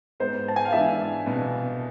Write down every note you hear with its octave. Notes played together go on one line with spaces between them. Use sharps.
G#2 G#3 B3 C5
A5
G#5
F5
G#2 E3 G#3 B3 D4 E5
C2 B2 B3